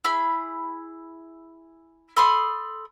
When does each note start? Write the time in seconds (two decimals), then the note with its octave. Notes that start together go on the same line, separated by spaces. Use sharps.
0.04 E4 G#4 B5
2.16 A4 B5 C6 D#6